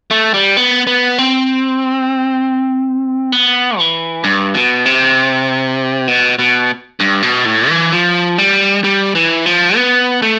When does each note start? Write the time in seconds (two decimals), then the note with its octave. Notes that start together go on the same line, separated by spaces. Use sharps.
0.11 A3
0.34 G3
0.57 B3
0.87 B3
1.18 C4
3.32 B3
3.78 E3
4.24 G2
4.54 B2
4.86 C3
6.08 B2
6.39 B2
7.00 G2
7.23 B2
7.45 A2
7.69 E3
7.92 F3
8.38 G3
8.84 G3
9.15 E3
9.46 F3
9.76 B3
10.22 A3